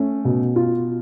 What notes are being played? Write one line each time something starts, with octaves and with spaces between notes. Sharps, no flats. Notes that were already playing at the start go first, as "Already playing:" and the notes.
Already playing: A3 C#4
B2
F4